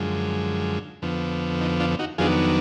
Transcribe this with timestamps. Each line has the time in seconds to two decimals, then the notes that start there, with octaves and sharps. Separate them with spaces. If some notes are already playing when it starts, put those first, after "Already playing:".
Already playing: F#2 D3 F3 G#3
1.02 F2 D3 F3 B3
1.61 D#4
1.80 D4 F4
1.99 D#4 F#4
2.18 F2 D#3 F#3 B3 D4 F4 G#4